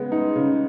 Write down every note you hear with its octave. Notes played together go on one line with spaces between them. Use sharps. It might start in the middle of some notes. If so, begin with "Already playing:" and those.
Already playing: C#3 G#3 B3
D#4
C#3